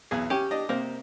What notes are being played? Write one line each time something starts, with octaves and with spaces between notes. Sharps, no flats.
B1 E2 G#4
C#4 G4
D4 D#5
C3 A#3 C5